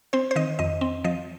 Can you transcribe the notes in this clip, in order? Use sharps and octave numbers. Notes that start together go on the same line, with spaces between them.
C4 C5
C5
D#3 D#5
F2 D#5
C4
F3 D#5